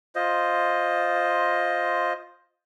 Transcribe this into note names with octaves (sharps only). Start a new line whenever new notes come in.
F4 C5 D#5